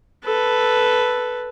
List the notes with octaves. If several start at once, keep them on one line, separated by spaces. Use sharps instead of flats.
A4 B4